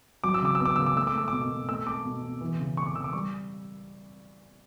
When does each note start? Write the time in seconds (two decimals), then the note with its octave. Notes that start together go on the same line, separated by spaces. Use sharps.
0.24 F#3 D6
0.34 E6
0.42 C#3 D6
0.55 E6
0.60 B3
0.65 D6
0.76 C#3 E6
0.86 D6
0.96 A3 E6
1.07 D6
1.14 A3 E6
1.28 B2 D6
1.51 B2
1.69 A3 E6
1.87 A3 D6
2.05 B2
2.23 B2
2.41 E3
2.59 C#3
2.77 A3 C#6
2.86 D6
2.95 C#3 E6
3.04 D6
3.13 G3 C#6